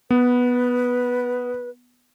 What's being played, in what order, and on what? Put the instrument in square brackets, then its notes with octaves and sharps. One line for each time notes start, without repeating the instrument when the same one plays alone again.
[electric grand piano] B3 [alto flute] B4